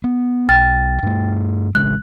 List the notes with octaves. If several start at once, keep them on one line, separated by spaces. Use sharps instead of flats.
B3
B1 G5 F6 A6
G2 A3
A1 C#3 G#3 F#6